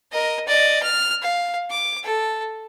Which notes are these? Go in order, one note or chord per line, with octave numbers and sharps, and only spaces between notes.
A#4 D#5
D5 D#5
F6
F5
D6
A4